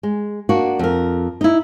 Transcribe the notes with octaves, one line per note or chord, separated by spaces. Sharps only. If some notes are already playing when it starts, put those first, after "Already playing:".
G#3
A#3 D4 F#4
F2 A#4
D#4 E4